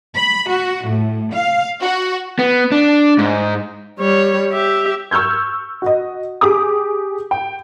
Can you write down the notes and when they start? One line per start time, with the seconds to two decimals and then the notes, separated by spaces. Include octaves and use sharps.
0.16 B5
0.48 F#4
0.86 A2
1.33 F5
1.82 F#4
2.39 B3
2.72 D4
3.18 G#2
3.99 G3 C#5
4.52 G4 E5
5.11 C#6 E6 F6 G6 G#6
5.82 F#4 D#5
6.41 G4 G#4 D6 D#6
7.31 G5